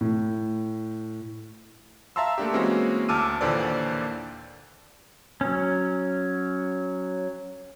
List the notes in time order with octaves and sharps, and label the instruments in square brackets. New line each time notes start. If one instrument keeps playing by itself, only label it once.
[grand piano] A2
[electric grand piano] E5 F5 A5 A#5 C6 E6
A3 A#3 D4 G4
E3 G#3 A#3 C4 C#4 F#4
D2 A5 D6 E6 F6 D#7
D#2 A#2 D3 E3 C5 D5
[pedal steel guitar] F#3 C#4